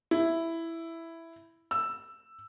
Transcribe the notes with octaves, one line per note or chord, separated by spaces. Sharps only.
E4
E6